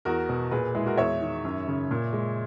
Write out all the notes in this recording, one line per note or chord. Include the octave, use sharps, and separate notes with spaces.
E2 F#4 A#4
B2
A#2 G#4 B4
G#3 E4 G#4
F#4 A#4
E2 C#5 E5
D#3
F#2
C#3
A#2
G#3